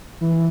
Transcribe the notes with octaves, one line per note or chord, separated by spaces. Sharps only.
E3